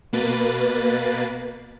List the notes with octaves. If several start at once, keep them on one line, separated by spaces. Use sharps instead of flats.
B2 A#3 B4 A6